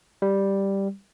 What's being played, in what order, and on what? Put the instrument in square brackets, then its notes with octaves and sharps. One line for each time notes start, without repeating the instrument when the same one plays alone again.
[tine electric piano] G3